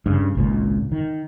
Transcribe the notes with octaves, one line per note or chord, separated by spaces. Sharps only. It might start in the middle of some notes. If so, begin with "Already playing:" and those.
G2 C#3
G#1 C#2 A#2
D#3